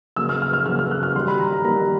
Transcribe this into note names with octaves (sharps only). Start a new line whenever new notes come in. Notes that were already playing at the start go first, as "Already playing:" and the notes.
C#3 F#3 A#3 E6
F6
F6
F6
C#3 F#3 A#3 F6
F6
F#6
F6
D#3 G3 A#3 C6
B5
A#5
A#5
D#3 G3 A#3 A#5